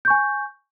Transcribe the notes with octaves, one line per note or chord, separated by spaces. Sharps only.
G#5 C#6 G6